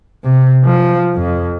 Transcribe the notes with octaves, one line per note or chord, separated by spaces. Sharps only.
C3
F3
F2